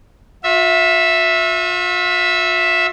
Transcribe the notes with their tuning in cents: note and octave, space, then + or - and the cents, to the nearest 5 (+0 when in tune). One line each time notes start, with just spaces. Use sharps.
F4 +45 E5 +0